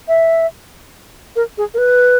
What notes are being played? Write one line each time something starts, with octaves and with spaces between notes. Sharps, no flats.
E5
A#4
G#4
A#4
B4